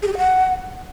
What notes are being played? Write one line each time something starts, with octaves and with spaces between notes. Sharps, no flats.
G#4
G4
G#4
F#5